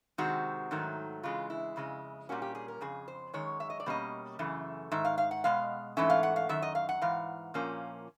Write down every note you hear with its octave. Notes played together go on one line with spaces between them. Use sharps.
C3 D#3 G#3 C4 F#4
G#2 D#3 F#3 A3
C#3 E3 G#3 F4
E4
F2 C#3 G#3
A#2 G3 A#3 C#4 F#4
G4
G#4
A#4
F2 C#3 G#4
C5
F#2 D#3 G#3 C#5
E5
D#5
D5
B2 G3 A#3 C#4 D#5
F#2 C#3 E3 A3
G#2 D#3 E5
F5
F5
F#5
B2 G#3 F5
G#2 E3 A3 C#4 E5
F5
F#5
F5
F#2 D#3 E5
D#5
F5
F#5
G#2 E3 F5
A#2 F3 A#3 C#4